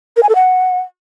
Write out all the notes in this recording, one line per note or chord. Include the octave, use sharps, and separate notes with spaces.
A#4
G#5
A4
F#5